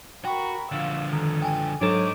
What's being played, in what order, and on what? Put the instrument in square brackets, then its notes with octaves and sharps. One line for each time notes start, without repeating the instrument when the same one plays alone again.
[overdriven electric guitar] F#4 [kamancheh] A#4 B5 [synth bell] G5 C#6
[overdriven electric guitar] D3 F3 [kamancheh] F5 E6
[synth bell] D#3 [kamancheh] A4
[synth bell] G5 G#5
[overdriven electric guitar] G#2 D#4 [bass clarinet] F#3 [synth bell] D4 A4 [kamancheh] D6